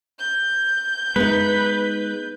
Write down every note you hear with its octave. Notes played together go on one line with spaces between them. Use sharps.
G6
G#3 B3 D#4 B4